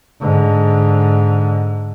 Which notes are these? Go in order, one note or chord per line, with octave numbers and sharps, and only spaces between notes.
G#2 D3